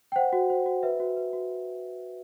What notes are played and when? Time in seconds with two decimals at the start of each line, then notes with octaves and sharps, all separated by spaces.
0.12 G5
0.16 C5 F#5
0.33 F#4
0.50 C5
0.66 F#4
0.83 B4 E5
1.00 F#4
1.17 B4
1.33 F#4